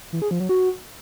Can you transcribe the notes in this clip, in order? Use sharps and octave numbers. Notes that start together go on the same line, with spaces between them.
E3
G#4
F3
F#3
F#4